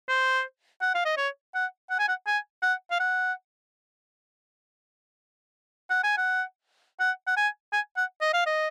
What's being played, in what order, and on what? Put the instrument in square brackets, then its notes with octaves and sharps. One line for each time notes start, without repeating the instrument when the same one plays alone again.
[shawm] C5
F#5
F5
D#5
C#5
F#5
F#5
G#5
F#5
G#5
F#5
F5
F#5
F#5
G#5
F#5
F#5
F#5
G#5
G#5
F#5
D#5
F5
D#5